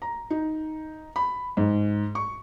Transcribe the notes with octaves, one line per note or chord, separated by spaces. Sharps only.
A#5
D#4
B5
G#2
C#6